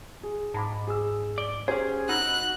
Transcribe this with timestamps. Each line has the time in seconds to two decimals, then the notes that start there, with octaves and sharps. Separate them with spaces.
0.23 G#4
0.54 G#2 A5 B5 D6
0.87 G#4 E6
1.38 D5 G7
1.68 C#4 G4 G#4 C5
2.09 D#4 F#4 B5 E6 F#6